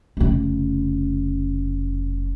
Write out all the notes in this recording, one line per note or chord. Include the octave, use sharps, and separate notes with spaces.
F1 C#3